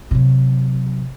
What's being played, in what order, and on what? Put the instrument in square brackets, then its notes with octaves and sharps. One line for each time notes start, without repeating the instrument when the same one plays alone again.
[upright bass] C3 F#3